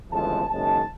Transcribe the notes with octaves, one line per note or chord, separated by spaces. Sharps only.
G1 F2 C#3 E3 G#3 A5
F#1 F#2 D#3 G#3 A5